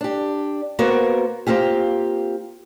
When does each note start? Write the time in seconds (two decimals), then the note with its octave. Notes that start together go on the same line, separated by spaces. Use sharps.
0.01 D4 G4
0.79 A#3 B3 F#4 A#4 C5
1.47 A#3 C4 F4 G4